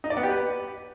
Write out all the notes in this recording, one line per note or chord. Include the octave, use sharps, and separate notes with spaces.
D#4
D5
B3
G4
B4